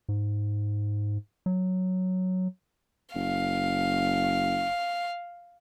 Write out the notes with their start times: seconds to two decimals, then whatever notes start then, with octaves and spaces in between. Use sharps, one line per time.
0.09 G#2
1.46 F#3
3.15 F#1 F5